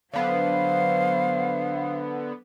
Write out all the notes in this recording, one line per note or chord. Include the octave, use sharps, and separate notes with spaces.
D3 F#3 B3 C5 F5